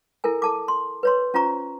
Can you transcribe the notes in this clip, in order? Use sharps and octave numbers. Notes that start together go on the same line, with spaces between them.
E4 A4 A#4 G#5
A4 A5 D6
C6
B4 C#5 C6
C#4 F4 C5 A#5 C#6